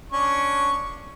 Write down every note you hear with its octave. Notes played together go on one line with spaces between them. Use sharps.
C#4 D4 C#6